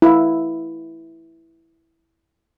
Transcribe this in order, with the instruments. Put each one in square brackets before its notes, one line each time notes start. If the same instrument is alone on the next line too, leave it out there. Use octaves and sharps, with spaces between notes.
[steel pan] E4 F5